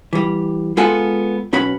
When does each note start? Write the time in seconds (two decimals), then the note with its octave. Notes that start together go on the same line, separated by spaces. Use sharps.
0.13 E3 G3
0.77 G#3 B3 F4 A4 F#5 G#5
1.53 B1 C#4 F#4 B4 B5